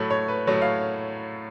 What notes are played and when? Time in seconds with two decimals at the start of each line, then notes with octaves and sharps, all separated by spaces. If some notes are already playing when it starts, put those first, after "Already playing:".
Already playing: A2 F#3 A3 B5
0.10 C#5
0.28 B4
0.47 A2 F#3 A3 C#5
0.62 F5